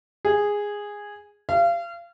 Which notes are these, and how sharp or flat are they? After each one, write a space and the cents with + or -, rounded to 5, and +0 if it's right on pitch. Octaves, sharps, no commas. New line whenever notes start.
G#4 -10
F5 -30